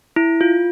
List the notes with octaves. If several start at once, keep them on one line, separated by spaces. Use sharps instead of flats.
E4
F4